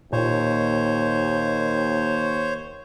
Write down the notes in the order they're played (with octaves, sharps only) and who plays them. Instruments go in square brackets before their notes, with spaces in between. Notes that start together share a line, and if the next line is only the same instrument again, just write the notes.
[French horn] D#2 [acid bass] A#2 [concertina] C5 C#5